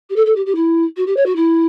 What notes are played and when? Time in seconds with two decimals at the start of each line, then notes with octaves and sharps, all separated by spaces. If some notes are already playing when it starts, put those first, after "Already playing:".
0.09 G4
0.16 A4
0.26 A4
0.35 G4
0.46 G4
0.55 E4
0.97 F#4
1.07 G4
1.16 C#5
1.26 F#4
1.36 E4